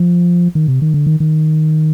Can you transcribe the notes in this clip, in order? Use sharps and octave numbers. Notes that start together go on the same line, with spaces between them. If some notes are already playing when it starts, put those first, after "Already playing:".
Already playing: F3
D#3
C3
D#3
D3
D#3
D#3